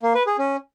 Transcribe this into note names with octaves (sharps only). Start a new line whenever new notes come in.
A#3
B4
G#4
C#4